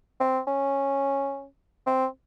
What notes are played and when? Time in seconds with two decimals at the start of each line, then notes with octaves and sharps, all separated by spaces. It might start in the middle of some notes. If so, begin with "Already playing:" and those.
0.20 C4
0.47 C#4
1.86 C4